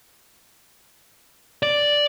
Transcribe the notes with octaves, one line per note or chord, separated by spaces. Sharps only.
D5